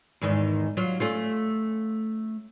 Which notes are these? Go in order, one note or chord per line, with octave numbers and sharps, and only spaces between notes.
E2 G#2 D#3
F#3 F4
A3 C#4 F4